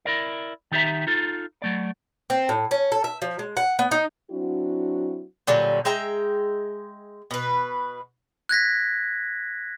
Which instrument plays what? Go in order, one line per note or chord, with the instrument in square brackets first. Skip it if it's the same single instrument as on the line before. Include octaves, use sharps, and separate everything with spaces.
[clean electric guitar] E4 A#4 D5
D#3 D#4 G4 C5 E5 A#5
D#4 F4 A4
F#3 A3 D5
[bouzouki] C4
A2
C#4
A4
E5
F3
G#3
F#5
B3
D#4
[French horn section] F#3 C4 D4 E4 F#4
[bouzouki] A#2 D3 F#3 G3
G#3 E5 G5 A#5
B2 B4
[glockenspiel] F#6 G#6 A#6 B6